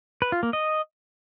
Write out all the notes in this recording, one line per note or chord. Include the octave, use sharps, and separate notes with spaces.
B4
F4
A#3
D#5